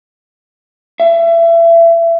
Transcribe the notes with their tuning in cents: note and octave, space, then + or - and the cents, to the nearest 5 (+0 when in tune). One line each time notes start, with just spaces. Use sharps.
E5 +30